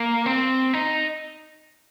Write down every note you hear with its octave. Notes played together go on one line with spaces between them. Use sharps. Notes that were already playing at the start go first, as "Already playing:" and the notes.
Already playing: A#3
C4
D#4